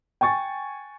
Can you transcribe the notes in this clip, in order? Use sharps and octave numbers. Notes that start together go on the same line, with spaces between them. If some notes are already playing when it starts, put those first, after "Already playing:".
G5 G#5 C#6 A6